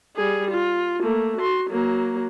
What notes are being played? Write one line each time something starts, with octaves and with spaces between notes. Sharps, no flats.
G3 G#4
F4
A3 A#3
F#4 C6
F#3 A#3